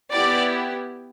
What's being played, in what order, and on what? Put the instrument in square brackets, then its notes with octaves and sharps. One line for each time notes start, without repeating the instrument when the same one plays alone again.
[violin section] B3 E4 G4 D5